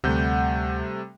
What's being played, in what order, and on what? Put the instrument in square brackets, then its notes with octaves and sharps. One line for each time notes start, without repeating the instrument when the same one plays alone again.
[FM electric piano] D2 G6 [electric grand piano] C3 G3 A3 [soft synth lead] F#5